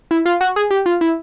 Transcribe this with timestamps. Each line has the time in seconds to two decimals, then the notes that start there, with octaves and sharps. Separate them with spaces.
0.11 E4
0.26 F4
0.41 F#4
0.56 G#4
0.71 G4
0.86 F4
1.01 E4